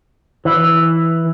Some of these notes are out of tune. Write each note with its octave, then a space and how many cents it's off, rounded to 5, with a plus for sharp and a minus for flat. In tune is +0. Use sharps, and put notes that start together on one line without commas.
E3 -5